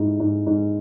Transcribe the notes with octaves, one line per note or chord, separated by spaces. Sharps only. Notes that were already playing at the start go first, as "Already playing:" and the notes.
Already playing: G#2 E4
G#2
G#2